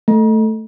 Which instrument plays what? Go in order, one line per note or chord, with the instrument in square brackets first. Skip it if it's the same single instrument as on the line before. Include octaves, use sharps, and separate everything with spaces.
[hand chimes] A3